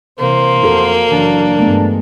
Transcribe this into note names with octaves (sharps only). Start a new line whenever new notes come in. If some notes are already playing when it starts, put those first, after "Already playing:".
C3 E3 A#3 C5
F2 F#4 A4 A#4
F#1 E3 F#3 D4
G2 G#3 A3 B3